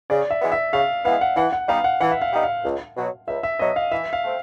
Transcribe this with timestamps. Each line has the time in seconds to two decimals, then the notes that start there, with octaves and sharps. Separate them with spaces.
0.10 C#3 D5
0.31 E5
0.42 E3 G#3 B3
0.52 E5
0.73 C#3 F5
1.05 E3 G#3 B3 F5
1.21 F#5
1.36 E3 F#5
1.53 F#5
1.68 G3 B3 D#4 F5
1.84 F#5
2.01 E3 F#5
2.11 E5
2.22 F5
2.32 G3 B3 D#4
2.43 F5
2.64 C#2
2.96 B2 F#3
3.28 C#2 E5
3.43 E5
3.59 B2 F#3 D#5
3.76 F5
3.92 E3 E5
4.13 F5
4.23 A3 C4